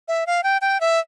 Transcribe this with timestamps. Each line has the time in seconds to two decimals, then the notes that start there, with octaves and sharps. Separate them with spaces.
0.08 E5
0.27 F5
0.43 G5
0.61 G5
0.81 E5